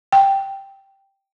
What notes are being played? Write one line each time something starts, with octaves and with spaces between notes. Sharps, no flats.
G5